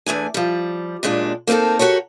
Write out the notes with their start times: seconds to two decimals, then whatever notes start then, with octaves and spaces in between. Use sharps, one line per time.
0.06 E2 A3 D4 G#5
0.34 F3 G3
1.03 F#2 A#2 G#3 D4
1.47 A#3 C4 C#4 D#4 A4
1.79 F#4 G4 A#4 C#5